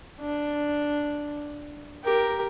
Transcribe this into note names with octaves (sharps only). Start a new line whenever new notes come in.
D4
G4 A#4